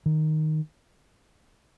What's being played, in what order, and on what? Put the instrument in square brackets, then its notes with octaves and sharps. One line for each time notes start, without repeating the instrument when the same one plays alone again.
[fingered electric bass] D#3